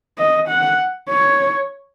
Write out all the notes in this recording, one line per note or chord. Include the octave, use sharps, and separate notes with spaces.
D#5
F#5
C#5